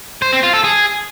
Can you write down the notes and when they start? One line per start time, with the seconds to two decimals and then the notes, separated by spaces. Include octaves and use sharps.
0.22 C5
0.33 C4
0.43 F4
0.54 A4
0.64 G#4